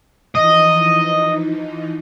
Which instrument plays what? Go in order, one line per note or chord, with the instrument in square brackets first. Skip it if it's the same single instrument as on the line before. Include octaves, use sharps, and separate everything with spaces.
[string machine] E3 F3 D#4 [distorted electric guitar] D#5